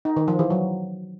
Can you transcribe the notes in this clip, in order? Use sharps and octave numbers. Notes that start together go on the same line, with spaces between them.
D#4
D#3
F3
E3
F#3